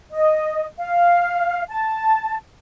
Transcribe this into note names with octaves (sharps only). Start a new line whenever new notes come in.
D#5
F5
A5